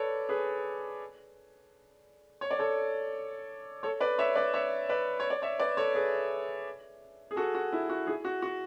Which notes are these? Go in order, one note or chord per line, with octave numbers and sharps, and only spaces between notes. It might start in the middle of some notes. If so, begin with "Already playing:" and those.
Already playing: A4 B4 C#5 D5
G#4 B4
C#5
D5
A4 C#5
A4 C#5
B4 D5
C#5 E5
B4 D5
C#5 E5
B4 D5
C#5
D5
C#5 E5
B4 D5
A4 C#5
G#4 B4
G#4
F#4 A4
F#4
E4
F#4
E4 G#4
F#4
F#4